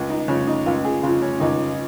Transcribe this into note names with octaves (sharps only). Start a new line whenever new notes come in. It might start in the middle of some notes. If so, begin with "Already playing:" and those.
Already playing: C#2
D#4
C#3 F3 C#4
D#4
C#2 F4
G#4
C#3 F3 F4
C#4
C#2 D#4